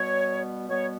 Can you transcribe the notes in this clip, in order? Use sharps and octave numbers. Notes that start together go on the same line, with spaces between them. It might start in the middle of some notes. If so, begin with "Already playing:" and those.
Already playing: B2 G3 B3 C#5
B2 G3 B3 C#5